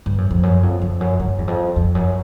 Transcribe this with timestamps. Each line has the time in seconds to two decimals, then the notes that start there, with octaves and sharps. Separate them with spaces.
0.06 G2
0.18 F#2
0.31 F2
0.43 F#2
0.63 F2
0.81 F2
1.01 F#2
1.20 G2
1.38 E2
1.47 F2
1.76 F2
1.95 F#2